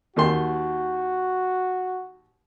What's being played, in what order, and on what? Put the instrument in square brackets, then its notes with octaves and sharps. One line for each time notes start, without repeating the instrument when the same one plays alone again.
[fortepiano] D#2 D#3 C6 [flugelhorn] F#4